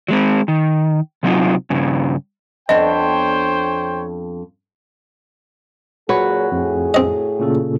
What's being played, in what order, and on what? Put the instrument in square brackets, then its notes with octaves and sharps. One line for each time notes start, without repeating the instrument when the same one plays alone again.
[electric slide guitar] F#3 G#3 C4
D#3
C3 F#3 C4 D4 D#4 F4
G2 C#3
[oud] F2 B3 D4 [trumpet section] C5 C#5 G5 [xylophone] D#5
[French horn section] A#2 F#3 G#4 [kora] F#4 B4 C#5
[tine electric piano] F2 [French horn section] A2 G#4
[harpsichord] C4 D#5
[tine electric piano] A#2 C#3 A4